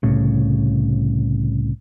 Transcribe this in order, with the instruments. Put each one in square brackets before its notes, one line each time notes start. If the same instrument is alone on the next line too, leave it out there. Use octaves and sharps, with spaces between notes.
[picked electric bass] C2 A2 C#3